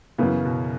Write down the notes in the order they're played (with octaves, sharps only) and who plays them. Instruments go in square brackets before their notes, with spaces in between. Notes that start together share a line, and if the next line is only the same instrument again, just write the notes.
[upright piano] F#2 E3 B3 [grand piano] C#3
[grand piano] B2